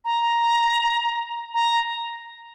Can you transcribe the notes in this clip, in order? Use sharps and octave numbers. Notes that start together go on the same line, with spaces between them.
A#5
A#5